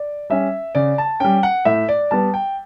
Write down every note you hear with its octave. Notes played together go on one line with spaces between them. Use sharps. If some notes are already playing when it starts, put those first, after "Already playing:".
Already playing: D5
G3 C#4 E5
C#3 D5
A5
G3 C#4 G5
F#5
A2 E5
D5
G3 B3 A5
G5